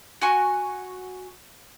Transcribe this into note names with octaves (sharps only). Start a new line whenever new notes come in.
F#4 G#5 C#6